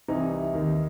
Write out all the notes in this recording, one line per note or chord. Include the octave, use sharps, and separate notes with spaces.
C2 C3 E3 D#4
D#2 D#3